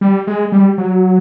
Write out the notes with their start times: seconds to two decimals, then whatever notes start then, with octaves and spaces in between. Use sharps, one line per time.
0.01 G3
0.27 G#3
0.52 G3
0.78 F#3